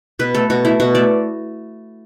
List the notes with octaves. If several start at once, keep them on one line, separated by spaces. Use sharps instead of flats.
B2 B4
A3 A4
B2 F#4
A3 E4
B2 F#4
A3 D5